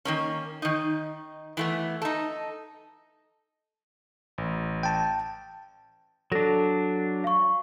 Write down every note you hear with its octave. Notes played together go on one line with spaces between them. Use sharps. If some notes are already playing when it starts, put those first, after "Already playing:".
D#3 A#3 C#4
D#3 D#4
E3 A3 B3
D#4 A4
A1
G5 A5
F#3 D4 A4 A#6
F5 C#6